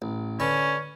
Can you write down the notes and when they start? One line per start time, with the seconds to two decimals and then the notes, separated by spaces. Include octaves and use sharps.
0.02 A1
0.40 D3 C#4 B4 A5